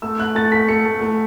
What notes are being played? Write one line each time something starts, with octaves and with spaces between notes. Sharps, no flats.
A3 E6
A3 F#6
A3 A6
A3 B6
A3 C#7
A3
A3